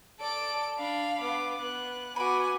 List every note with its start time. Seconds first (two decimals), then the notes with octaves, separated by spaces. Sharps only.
0.20 A4 D5 D7
0.78 D4 F5 B5
1.19 B3 D6
1.60 B3 F#6
2.16 B3 F#4 G#5 B5 D6